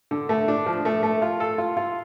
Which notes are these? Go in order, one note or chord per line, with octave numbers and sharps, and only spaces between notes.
D3
A3
D4
F3
A3
A3
F4
A4
F4
F4